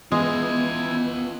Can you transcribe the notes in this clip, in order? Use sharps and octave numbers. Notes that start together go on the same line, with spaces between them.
E3 G#3 B3 F4 D#5 G#5